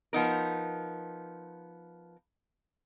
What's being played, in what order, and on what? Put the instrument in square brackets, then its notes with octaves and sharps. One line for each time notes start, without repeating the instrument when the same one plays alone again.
[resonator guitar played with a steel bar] F3 B3 D#4 A#4